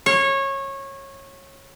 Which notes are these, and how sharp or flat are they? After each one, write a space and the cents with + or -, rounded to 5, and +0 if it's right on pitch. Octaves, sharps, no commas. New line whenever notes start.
C#5 -20